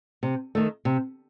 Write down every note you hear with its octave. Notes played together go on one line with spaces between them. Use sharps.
C3
D#3 A3
C3